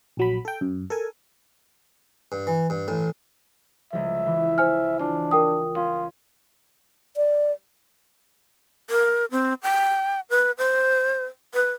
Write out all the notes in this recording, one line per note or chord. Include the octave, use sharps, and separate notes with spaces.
A#1 F#3 B5
A4 G5
F#2
A4 A#4 G#5
G2
E3
G2
A1 A2
C#2 F3 E5
E3
C5 G#5 F6
D4 F4
A#4 G5 D#6
C#4 F4
D5
A#4
C4
G5
B4
C5
B4